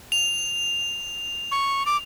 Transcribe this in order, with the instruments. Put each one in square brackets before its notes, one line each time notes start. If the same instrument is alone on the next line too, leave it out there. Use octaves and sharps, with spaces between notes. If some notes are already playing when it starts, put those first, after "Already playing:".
[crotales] F7
[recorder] C#6
D6